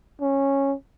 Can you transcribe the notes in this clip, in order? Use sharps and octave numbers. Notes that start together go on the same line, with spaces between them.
C#4